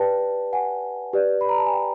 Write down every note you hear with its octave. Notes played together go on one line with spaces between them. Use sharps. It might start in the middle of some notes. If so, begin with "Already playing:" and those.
Already playing: G4 B4 D5 G5 A5
F#5 G#5
G4 B4 D5
B5
A#5
A5
G#5
G5